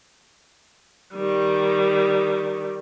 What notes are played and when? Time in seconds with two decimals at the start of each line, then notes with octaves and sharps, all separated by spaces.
1.14 D#3 G3